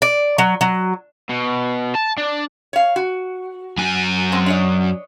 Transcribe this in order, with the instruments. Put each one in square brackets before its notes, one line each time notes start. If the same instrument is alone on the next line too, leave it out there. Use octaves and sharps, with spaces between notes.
[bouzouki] D5
F#3
F#3
[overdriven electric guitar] B2
A5
D4
[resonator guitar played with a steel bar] C#5 F5
F#4
[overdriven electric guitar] F#2 G#5
[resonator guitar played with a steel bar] G#3 C4
D4 C#5 D#5